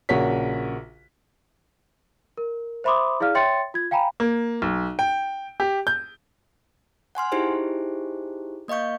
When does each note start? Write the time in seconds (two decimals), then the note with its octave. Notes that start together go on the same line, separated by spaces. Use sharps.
0.09 A#1 C#3 F#4 A#4 C#5 B6
2.37 A#4
2.84 C5 E5 B5 C6 D6 D#6
3.20 E4 G#4 D5 F5 F6
3.35 C#5 E5 G5 C6 A6 C#7
3.74 F4 G#6
3.91 F5 G5 G#5 A#5 B5
4.20 A#3
4.62 B1
4.99 G5
5.60 G4
5.87 G6
7.15 F#5 G#5 C6 F6
7.32 D#4 E4 G4 G#4 C5
8.68 A#3 D#5 F5 C#6 G6